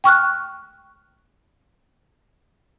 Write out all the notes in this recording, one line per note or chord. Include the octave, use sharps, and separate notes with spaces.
G5 C#6 F6 F#6